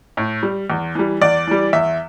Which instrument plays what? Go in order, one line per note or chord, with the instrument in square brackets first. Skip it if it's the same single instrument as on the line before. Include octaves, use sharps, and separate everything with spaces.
[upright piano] A2
G3
E2
E3 G3
E2 D5
E3 G3
E2 E5